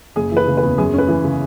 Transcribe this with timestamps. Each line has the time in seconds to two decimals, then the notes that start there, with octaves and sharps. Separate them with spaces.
0.16 F#1 G#4
0.32 E3 B4
0.47 C#3
0.57 B4
0.63 E2
0.78 F#2 G#4
0.93 C#4 B4
1.08 E3
1.24 C#3